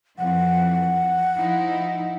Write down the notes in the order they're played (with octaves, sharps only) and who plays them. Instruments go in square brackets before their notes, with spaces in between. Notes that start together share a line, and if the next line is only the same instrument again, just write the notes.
[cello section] F2 E3 [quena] F#5
[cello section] F3 D#4 E4